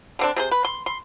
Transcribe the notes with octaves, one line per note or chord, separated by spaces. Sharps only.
D3 C4 D4
C3 G#4 C5
B4
C6
C6